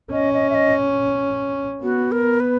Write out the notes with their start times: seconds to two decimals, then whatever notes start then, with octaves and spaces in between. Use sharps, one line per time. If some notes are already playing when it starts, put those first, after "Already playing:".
0.12 C#4 D#5
0.34 D#5
0.50 E5
0.55 D#5
1.83 B3 F#4
2.12 A#4
2.40 B4